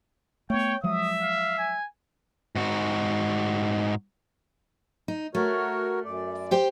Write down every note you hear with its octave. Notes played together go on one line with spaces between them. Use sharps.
A3 B3 C#5 G5
F3 F#3 G#3 E5 D#6
F5
G#5
G#2 F#4
D#4
A3 F#4 A#4 C#5
F#2 D5
G4 C5 G5